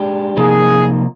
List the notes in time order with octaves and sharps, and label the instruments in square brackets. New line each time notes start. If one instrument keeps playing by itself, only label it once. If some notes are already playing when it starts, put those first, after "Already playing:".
Already playing: [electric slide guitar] G#3 D4 G4
[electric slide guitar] C3 F3 A#3 D#4 [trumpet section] G#4